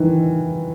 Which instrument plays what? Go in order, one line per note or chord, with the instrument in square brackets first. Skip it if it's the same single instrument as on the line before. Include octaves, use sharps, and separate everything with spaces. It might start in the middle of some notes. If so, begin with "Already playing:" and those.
Already playing: [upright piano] D#3 E3